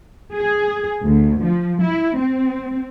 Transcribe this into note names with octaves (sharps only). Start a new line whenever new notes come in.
G#4
D2
F3
E4
C4